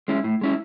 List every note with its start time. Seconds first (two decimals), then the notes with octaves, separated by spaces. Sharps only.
0.08 G#3 C#4 E4
0.24 A2
0.41 G#3 C#4 E4